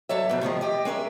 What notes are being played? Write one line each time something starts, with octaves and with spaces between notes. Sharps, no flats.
G2 F#3 A4 C#5 E5
G#2 B2 F3
A2 D#3 F3 G#3
G4 D#5
G#3 C#4 A#4 E5